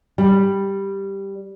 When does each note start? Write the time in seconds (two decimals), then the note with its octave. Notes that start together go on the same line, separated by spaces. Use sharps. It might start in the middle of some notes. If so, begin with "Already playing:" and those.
0.18 G3